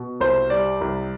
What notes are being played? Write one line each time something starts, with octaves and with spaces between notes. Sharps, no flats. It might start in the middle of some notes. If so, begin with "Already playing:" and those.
Already playing: B2
C2 C5
G3 D5
C2